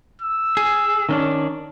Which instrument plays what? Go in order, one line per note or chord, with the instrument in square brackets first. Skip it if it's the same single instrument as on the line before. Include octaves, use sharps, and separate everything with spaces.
[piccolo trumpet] E6
[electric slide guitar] G#4
D#3 C#4 D4